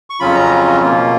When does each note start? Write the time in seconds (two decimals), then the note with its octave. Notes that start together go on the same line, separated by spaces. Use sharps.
0.10 C#6
0.20 F2 C#3 F#3 C#4 F4 B5
0.35 A#5
0.81 B2 A#3 F4